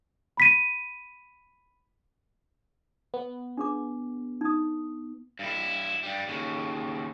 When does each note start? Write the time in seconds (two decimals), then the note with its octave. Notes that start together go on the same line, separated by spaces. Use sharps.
0.37 B5 B6 D#7
3.14 B3
3.57 D4 G#4 D6
4.41 D#4 D#6
5.39 G2 E4
6.03 G2 G3
6.28 D#2 C#3